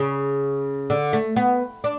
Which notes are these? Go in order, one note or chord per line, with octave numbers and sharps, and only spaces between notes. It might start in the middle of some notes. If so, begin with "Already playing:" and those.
Already playing: C#3
D3
A3
B3
D4